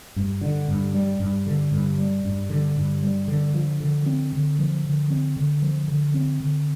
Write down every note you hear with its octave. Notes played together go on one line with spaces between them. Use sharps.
G2
D3
G2
G3
G2
D3
G2
G3
G2
D3
G2
G3
D3
F3
D3
C4
D3
F3
D3
C4
D3
F3
D3
C4
D3